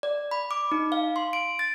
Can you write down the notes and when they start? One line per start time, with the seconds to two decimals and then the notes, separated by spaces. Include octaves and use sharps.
0.03 D5
0.31 B5
0.51 D6
0.72 D#4
0.92 F5
1.16 C6
1.33 D7
1.59 A6